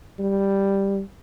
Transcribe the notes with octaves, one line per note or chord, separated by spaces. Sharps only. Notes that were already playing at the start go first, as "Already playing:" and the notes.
G3